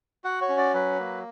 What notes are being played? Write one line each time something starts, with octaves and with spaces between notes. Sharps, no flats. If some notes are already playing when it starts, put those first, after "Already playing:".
F#4 F#5
C#5
C#4
D5
F#3 B4
A#3